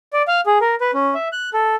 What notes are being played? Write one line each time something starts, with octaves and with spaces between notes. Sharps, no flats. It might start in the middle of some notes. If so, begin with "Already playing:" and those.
D5
F5
G#4
A#4
B4
C#4
E5
F#6
A4